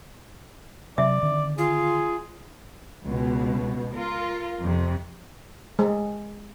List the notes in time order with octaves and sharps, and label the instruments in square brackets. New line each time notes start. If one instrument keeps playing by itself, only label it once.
[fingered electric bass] C3 F#3 [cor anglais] D5 [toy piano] E5
[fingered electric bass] D3 D#3 C4
[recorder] F4 [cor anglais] G#4
[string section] C#2 B2
F4 A#4
F2 C3
[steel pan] G#3